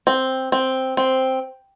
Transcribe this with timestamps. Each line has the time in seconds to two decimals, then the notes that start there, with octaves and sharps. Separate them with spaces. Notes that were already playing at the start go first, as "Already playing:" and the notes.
0.07 C4
0.52 C4
0.97 C4